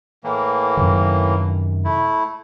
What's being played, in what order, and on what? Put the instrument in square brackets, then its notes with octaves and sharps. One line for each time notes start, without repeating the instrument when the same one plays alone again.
[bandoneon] A2 E3 A#3
[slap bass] F#2 C3 D#3
[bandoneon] A3 E4